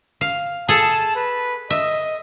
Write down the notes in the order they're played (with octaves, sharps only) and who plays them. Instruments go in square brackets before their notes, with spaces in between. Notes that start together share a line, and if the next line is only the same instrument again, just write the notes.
[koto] F5
[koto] G#4 A4 [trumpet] A5
[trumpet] B4
[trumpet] D#5 [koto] E5